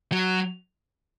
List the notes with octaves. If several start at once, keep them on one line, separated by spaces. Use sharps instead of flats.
F#3